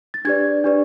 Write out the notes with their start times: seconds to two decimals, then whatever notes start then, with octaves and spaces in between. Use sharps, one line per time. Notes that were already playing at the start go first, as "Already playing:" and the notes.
0.14 A6
0.25 D4 G4 B4 D5 G#6
0.64 D4 G4 B4 D5